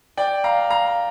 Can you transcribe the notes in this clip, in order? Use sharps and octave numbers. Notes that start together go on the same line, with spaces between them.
D5 G5
F5 A#5
F5 A#5